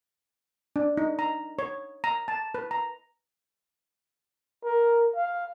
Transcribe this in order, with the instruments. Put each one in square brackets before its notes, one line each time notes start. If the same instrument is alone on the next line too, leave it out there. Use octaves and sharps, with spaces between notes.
[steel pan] D4
D#4
A#5
C#5
A#5
A5
B4
A#5
[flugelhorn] A#4
F5